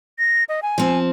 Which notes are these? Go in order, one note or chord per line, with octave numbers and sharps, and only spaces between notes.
A#6
D#5
G#5
F3 C4